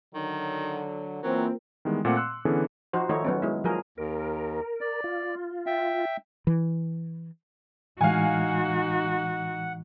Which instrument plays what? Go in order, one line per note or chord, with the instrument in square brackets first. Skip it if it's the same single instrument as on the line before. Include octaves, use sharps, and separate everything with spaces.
[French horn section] D3 F#3 [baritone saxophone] D#3
[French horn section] E3 [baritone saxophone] F#3 [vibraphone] A#3 F4 A#4 [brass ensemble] C4
[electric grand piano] D#3 E3 G3 G#3 B3
A#2 A3 C4 F#5 D6 C#7
C6 E6 F#6 C#7
D3 E3 B3 C#4 G#4 A4
[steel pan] F3 D#4 F#4 C5
D#3 A3 D#4 C#5
F#3 B3 C#4
G#3 E4
F3 F#3 G#4 A#4
[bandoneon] D#2 [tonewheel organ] A#4
[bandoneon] D5
[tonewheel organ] F4
[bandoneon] E5 G5
[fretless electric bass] E3
[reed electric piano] A2 E3 G#3 [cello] D#4 F#4 [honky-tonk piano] F5 G#5 [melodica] F#5